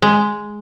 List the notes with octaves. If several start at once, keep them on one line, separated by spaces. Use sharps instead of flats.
G#3